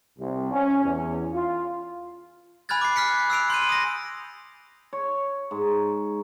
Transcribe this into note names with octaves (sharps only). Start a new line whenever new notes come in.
C2
C#4
E2
F4
G#5 B5 F6 F#6 G#6 A6
D6 C7
F6 F#6 B6 C#7
E6 C7 D7 F7
C6 G6 D#7
D#6 A#6
C#5
G#2